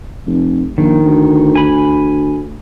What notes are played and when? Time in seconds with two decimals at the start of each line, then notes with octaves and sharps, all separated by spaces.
0.27 F1
0.78 A#1 D#3
1.05 D2
1.55 G#5 B5